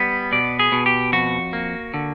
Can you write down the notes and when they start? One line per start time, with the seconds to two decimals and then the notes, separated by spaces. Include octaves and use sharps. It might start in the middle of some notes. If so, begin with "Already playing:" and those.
Already playing: G3 B3
0.32 B2 D5
0.59 G#4
0.72 B2
0.86 G4
1.12 F2 F#4
1.53 A#3
1.94 D3